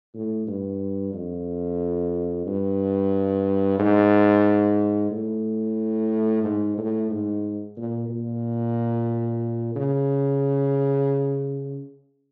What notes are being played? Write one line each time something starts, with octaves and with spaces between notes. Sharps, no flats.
A2
G2
F2
G2
G#2
A2
G#2
A2
G#2
A#2
A#2
C#3